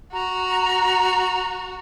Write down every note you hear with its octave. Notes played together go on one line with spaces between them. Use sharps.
F#4 A#5